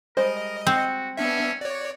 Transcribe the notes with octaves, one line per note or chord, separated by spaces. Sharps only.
G3 G#3 A#4 C5 D#5
C4 F#4
B3 C#4 D4 E5
F#4 C#5 D5